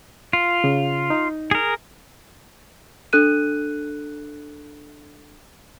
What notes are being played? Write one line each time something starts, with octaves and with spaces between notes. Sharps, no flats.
F4
C#3
D#4
G#4 A#4
D4 A4 F#6 D#7